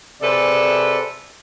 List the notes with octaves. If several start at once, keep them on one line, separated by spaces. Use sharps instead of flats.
C3 G#4 A4 B4 C5 D5